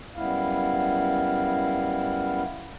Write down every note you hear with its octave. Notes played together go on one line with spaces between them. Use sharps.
F#2 G3 B3 E4 F5